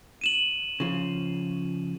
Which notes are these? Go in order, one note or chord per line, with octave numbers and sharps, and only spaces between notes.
D#7 E7 F#7
C#3 F3